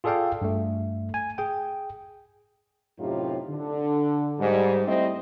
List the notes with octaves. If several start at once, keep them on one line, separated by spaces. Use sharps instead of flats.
F4 G#4 A4 D5 F5 G5
G2 A3
G#5
G#4 G5
F#2 A2 C3 D#4 F4 G4
D3
G#2 G3
G3 A3 C4 E4 D#5